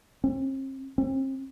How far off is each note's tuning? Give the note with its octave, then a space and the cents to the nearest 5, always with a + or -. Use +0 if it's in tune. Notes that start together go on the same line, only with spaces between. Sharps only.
C4 +45
C4 +40